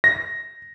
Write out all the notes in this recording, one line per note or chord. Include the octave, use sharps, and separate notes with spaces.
A#6